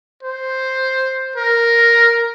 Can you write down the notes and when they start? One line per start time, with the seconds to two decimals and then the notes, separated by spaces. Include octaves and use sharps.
0.23 C5
1.36 A#4